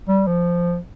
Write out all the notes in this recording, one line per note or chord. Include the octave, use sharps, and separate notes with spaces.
G3
F3